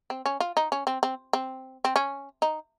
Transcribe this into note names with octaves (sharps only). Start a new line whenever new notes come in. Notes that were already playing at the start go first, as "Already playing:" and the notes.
C4
C#4
F4
D#4
C#4
C4
C4
C4
C4
C#4
D#4